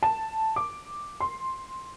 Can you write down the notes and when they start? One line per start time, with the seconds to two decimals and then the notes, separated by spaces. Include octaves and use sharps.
0.03 A5
0.56 D6
1.20 C6